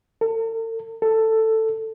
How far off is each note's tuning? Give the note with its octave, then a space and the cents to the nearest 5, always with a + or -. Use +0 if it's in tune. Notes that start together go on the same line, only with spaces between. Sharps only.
A4 +45
A4 +10